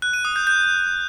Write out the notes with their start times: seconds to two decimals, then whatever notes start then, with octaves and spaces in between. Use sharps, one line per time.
0.02 F#6
0.13 D#7
0.25 D#6
0.36 G6
0.47 G6